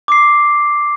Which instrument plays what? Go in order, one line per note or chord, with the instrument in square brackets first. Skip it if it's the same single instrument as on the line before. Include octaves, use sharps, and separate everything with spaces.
[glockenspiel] D6 C7